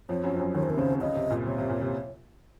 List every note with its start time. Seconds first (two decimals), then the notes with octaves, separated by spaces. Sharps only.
0.09 F2 F3 C#5
0.24 F#2 F#3
0.34 F3
0.39 F#2 F#3
0.54 D#2 D#3 C#5
0.63 C5
0.68 C3 A#4
0.77 C#2 C#3 C5
1.00 C#2 C#3 D#5
1.15 C3
1.30 A#2
1.46 C3 C#5
1.58 C3
1.69 A#2
1.81 C3